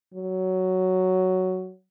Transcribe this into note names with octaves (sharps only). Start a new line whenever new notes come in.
F#3